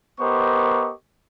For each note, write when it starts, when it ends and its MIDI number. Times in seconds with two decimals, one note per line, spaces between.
0.20 0.92 59
0.20 0.92 67
0.20 0.92 70
0.20 0.92 72
0.20 0.92 75
0.20 0.92 85